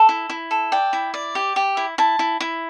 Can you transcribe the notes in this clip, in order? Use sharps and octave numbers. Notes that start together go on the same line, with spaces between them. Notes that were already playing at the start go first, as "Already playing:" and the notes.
Already playing: A4
E4
E4
A4
D5 G5
E4
D5
G4
G4
E4
E4 A5
E4
E4